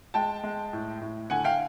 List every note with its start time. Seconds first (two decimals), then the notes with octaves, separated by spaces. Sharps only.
0.14 G#3 G5 A5
0.43 G#3
0.73 A2
1.01 A2
1.30 D3 F#5 G#5
1.44 F5 G5